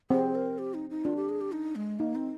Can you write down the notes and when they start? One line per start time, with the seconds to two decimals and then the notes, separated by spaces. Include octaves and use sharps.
0.10 C4 G#4
0.35 A#4
0.58 G4
0.74 D#4
0.90 D#4
1.05 D4 F4
1.16 G4
1.29 G#4
1.41 G4
1.52 D#4
1.76 G#3
1.99 A#3 D#4
2.15 C4